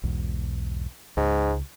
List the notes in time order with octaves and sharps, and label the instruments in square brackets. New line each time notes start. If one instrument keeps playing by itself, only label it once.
[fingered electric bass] B1 E2 G#2
[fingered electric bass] C#2 [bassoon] G#2